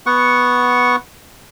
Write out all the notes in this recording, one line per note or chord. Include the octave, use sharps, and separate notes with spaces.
B3 F#5 C#6